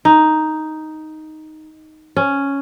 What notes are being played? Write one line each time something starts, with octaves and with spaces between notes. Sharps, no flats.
D#4
C#4